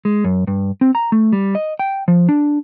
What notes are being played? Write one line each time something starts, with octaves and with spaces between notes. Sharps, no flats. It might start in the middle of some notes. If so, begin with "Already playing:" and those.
G#3
F#2
G2
C4
A#5
A3
G3
D#5
G5
F3
D4